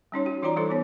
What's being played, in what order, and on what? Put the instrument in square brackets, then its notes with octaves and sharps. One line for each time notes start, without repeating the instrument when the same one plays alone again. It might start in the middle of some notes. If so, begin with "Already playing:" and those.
[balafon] G3 C#4 D#4 C#5
F#4
E3 D#4 F4 C#5 D5 A#5
G3 D#4 E4 A4 C5
E3 B3 C#5